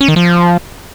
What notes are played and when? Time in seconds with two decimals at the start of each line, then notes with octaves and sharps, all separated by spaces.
0.01 C#4
0.08 D#3
0.16 F3